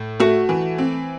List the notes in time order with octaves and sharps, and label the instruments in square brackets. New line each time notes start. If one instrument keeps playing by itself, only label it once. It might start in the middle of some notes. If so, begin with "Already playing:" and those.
Already playing: [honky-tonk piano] A2
[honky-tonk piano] A3 [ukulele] F#4
[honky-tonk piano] E3
C4